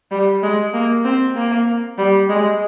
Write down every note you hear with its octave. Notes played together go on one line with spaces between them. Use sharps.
G3
G#3
A#3
C4
A#3
G3
G#3